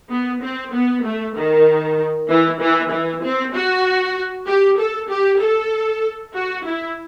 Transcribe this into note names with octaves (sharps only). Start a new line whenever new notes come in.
B3
C4
B3
A3
D#3
E3
E3
E3
C4
F#4
G4
A4
G4
A4
F#4
E4